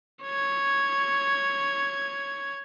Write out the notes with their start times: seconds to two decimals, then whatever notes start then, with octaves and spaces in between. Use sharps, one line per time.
0.24 C#5 G#6